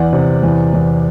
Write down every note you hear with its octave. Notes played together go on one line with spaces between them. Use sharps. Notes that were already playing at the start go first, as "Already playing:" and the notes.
Already playing: E2 D5 F#5
C3
E2
E2